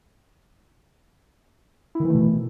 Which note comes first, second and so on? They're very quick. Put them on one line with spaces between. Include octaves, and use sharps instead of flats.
E4 D#3 E3 A3 B2